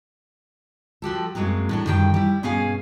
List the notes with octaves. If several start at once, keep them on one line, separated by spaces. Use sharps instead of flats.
F3 F#4 G4 A4
F#2 F#3 G#3 A#3 C4
A2 F#3 D4
F#2 D3 D#3 G3 G#4 G5
G3 E4
G2 B2 C#4 G#4 F5 G#5